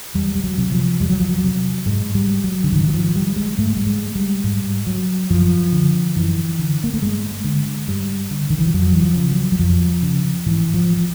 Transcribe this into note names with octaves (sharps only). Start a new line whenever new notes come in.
E2 G3
G3
F#3
C3
F3
E2 G3
F#3
F3
F#3
C3
G#2 G#3
G3
F#3
D3
G#2 D#3
F#3
F3
G3
G#3
G#2 A3
G3
G#3
G3
G#2 G3
F#3
F#2 F3
D3
F#2 E3
D3
A#3
A3
G2 G#3
D3
G2 G3
D3
D#3
E3
F3
F2 F#3
E3
F3
C#3
F#3
F#3
F2 F3
C#3
G#2 E3
F3
F3